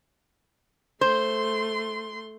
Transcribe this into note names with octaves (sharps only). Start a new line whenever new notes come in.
A3 C5 C6